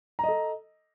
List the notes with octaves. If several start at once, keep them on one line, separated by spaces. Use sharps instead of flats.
A4 D#5 A#5